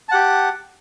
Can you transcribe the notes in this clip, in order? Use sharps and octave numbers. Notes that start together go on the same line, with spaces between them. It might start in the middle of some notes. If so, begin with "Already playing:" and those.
G4 F#5 A5